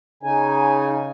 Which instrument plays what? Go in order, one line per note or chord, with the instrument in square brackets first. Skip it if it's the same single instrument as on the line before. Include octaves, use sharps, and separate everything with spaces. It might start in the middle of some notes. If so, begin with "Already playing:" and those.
[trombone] C#3 [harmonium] D#4 G#5